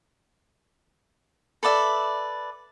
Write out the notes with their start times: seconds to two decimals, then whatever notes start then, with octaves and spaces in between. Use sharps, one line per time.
1.63 A4 B4 D5 E5